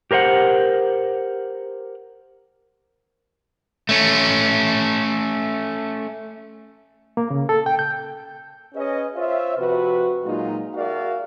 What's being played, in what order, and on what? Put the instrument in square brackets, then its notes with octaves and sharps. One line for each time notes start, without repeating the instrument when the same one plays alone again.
[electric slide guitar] G4 A#4 C5 E5 F#5
[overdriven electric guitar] A3 C#4
[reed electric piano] A#3
C#3
A4
G5
G6
[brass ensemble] C#4 G#4 B4 C#5 D#5
F4 C5 C#5 E5
C3 F3 F#4 B4
A#2 F#3 G#3 A#3 D#4 F4
F#4 G#4 A#4 D5 E5 F5